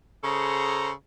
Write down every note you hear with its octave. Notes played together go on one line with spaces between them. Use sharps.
C#3 G#4 A4 C5 A#5